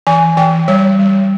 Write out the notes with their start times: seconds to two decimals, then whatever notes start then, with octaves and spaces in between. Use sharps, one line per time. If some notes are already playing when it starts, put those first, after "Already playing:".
0.07 E3 G#5
0.37 E3 G5
0.68 G3 C#5
0.99 G3